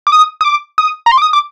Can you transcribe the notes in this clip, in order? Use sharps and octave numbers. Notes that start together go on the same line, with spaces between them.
D6
D#6
D#6
D6
D#6
A#5
C6
D6
D#6
D6